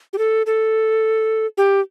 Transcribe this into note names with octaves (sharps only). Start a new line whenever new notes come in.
G4
A4
A4
G4